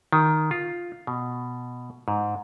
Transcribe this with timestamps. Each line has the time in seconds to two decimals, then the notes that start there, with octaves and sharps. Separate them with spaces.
0.12 D#3
0.51 F4
1.07 B2
2.08 G#2